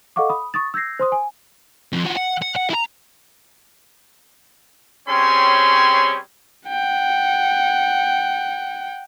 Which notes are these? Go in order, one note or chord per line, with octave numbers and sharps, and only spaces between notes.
A4 D#5 F5 F#5 C#6 D6
B5 D#6
C#6 D#6 A6
E6 G6 G#6 A#6 C7
C5 C6 D#6
G#5
F2 F3
F3 F#4
F#5
F#5
F#5
E4 A#5
G3 C4 C#4 G#4 C#5 C6
F#5 G5